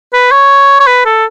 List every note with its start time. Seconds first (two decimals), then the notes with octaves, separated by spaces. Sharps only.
0.13 B4
0.31 C#5
0.80 C#5
0.87 B4
1.06 A4